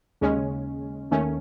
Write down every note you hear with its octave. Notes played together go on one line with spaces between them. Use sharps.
D#2 C#3 G#3 C#4
D#2 D#3 A3 C#4